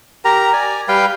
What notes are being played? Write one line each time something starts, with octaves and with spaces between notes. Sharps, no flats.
G4 A#4 A#5
D5 G#5
G3 B4 F5 G5